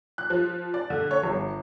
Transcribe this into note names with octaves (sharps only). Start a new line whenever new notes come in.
F#6
F3
D5
D3
C#5
G1